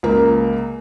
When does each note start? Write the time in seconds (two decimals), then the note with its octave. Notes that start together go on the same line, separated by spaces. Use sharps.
0.03 C#2 A#3